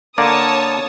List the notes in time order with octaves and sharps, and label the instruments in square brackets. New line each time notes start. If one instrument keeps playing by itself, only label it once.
[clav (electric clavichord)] D3 A#3 D5 [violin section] C#5 A5 D#6